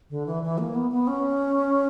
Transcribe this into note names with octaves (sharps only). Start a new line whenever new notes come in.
D3
E3
E3
A#3
B3
B3
C#4